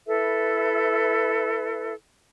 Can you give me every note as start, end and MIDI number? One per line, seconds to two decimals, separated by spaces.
0.07 1.94 64
0.07 1.94 69
0.07 1.94 71
0.07 1.94 76